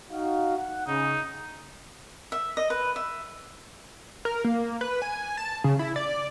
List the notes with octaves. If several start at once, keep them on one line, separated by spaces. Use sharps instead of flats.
D#4 F#4 F5
F#5
C#3 D#4
E5
D#5
B4
E5
A#4
A#3
B4
G#5
A5
C#3
E4
D5